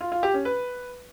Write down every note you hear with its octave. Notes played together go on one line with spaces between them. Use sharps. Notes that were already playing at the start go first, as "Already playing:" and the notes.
F4
F4
G4
C#4
B4